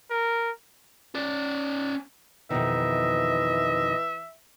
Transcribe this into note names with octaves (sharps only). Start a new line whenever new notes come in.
A#4
C#4 D5
F2 B2 D#3 E3 D#5 E5